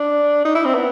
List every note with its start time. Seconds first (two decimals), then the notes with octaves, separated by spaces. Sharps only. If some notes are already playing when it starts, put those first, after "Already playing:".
Already playing: D4
0.45 D#4
0.55 E4
0.65 C4
0.74 B3